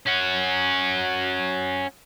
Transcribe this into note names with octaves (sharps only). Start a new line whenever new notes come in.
C#4 F#4